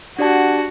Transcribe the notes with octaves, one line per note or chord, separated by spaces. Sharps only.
D4 F#4 G4 D5 F#5 A5